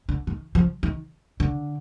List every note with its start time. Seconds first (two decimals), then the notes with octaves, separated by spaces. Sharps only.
0.09 D3
0.27 D#3
0.55 F3
0.83 D#3
1.40 D3